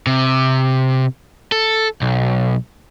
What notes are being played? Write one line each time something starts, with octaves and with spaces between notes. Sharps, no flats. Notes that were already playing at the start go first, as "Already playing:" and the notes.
C3
A4
B1